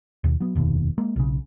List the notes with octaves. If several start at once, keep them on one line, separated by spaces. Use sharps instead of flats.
D#2 B2
F#3 B3
F1 D#2 B2
G#3 A#3
B1 C#3